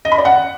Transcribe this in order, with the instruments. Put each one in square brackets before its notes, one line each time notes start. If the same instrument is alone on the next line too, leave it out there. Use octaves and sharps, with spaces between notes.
[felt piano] D#5
B5
D5
F#5